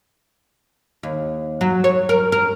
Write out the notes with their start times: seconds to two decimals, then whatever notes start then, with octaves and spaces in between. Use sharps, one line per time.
1.03 D#2
1.61 F#3
1.84 C#5
2.09 A#4
2.32 A#4